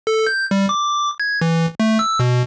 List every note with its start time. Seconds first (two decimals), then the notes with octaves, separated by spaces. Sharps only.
0.07 A4
0.27 G6
0.51 G3
0.69 D6
1.20 G#6
1.41 E3
1.80 A3
1.99 E6
2.20 B2